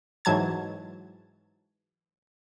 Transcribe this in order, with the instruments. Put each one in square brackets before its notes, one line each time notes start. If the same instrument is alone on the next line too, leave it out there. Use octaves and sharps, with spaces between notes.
[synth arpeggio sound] G#2 E3 F#3 A5 G#6